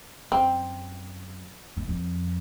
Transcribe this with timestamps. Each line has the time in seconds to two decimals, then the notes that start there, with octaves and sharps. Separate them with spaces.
0.31 F#2 C4
1.77 E2
1.88 F2